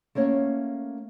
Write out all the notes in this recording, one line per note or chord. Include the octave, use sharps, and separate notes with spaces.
A3 A#3 C#4 C#5 F#5